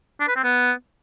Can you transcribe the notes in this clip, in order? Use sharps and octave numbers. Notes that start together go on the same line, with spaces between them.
D4
B4
C4
B3